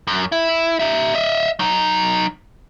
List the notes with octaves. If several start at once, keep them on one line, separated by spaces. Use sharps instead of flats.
F#2
E4
D#4 E5
D#5 E5
F#3 D#4